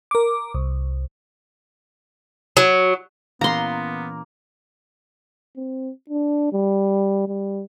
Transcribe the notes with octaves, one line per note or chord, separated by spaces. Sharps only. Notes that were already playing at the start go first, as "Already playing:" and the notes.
A#4 D6
C2
F#3
A#2 E3 A#3 B3 C#4 A#5 C6
C4
D4
G3
G3